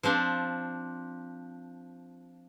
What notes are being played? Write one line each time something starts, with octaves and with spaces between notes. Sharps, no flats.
F3 C4 D4 F4